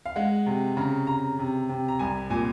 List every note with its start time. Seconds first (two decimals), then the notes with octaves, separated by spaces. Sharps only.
0.06 F5
0.16 G#3 F#5
0.46 C3
0.77 C#3 A#5
1.07 C#3 A#5
1.39 C3
1.69 C3
1.88 A#5
1.99 C2 G#5
2.30 A#2 G#5